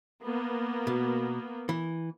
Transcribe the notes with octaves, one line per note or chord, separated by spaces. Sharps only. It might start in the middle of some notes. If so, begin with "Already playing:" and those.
A#3 B3
B2
E3